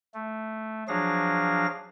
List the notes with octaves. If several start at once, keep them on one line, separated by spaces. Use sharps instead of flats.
A3
F3 F#3 D4 G#4 F5 A#6